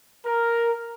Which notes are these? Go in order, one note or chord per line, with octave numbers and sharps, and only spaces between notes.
A#4